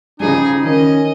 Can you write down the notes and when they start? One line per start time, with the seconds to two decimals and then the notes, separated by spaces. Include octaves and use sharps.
0.20 C#3 F3 G3 D#4 G#4
0.65 D#3 C#4 D#5